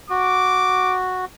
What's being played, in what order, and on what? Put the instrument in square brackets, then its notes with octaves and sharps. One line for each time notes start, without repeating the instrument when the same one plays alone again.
[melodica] F#4 [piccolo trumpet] D6